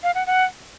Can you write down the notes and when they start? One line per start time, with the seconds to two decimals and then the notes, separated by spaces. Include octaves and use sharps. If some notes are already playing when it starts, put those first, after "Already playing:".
0.03 F5
0.15 F#5
0.27 F#5